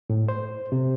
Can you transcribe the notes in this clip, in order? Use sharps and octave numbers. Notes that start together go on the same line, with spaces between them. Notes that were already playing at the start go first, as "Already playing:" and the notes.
A2
C5
C3